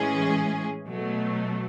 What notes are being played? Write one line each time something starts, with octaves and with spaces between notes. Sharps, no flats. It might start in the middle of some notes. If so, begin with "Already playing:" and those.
Already playing: A2 E3 G#3 C#4 G#4
B2 F#3 A3